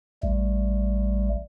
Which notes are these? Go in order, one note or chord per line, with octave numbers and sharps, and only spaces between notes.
A1 G3 A3